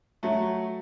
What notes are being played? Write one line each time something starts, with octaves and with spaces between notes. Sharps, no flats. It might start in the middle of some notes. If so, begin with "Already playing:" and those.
F#3 A3